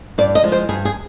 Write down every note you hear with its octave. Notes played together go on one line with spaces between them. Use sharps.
G2 D5
D#5
F3 G#3
C5
G2 G#4
G#4